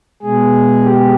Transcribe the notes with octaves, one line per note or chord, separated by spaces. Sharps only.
B2 G#3 G#4
G4